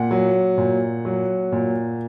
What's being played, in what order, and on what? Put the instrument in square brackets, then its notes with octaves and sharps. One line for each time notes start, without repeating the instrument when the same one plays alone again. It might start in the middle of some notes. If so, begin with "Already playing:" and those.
Already playing: [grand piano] A#2 F#5
F#3
A#2
F#3
A#2